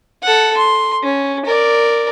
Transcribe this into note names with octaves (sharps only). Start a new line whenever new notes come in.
A4 F#5
C6
C#4
A#4 D5